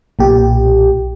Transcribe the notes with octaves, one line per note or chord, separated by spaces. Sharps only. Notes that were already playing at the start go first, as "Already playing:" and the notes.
B1 A#2 G4